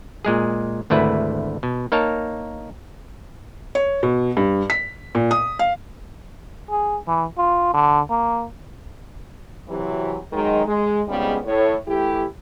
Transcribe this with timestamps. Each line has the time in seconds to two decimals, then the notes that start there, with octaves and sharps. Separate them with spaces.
0.25 A#2 G#3 G#4
0.90 G#1 D2 A3 E4 B4
1.63 B2
1.92 A#3 D#4 A#4 C#5 A5
3.75 C#5
4.03 B2
4.37 G2
4.70 B6
5.15 A#2
5.31 D#6
5.59 F5
6.70 G#4
7.08 E3
7.38 F4
7.74 D3
8.10 A#3
9.69 C3 E3 F#3
10.33 D#3 F#3 G#3
10.66 G#3
11.08 F2 G#2 C#3 G3 G#3 B3
11.45 A2 C#5
11.88 E3 A3 E4 G4